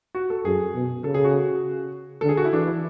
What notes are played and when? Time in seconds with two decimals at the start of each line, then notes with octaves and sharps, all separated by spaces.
0.15 F#4
0.30 A4
0.45 F#2 G#4
0.75 B2
1.04 C#3 A4
1.14 G#4
1.24 F#4
2.21 D3 A4
2.29 G#4
2.37 F#4
2.45 E4
2.53 E3 D4
2.67 E4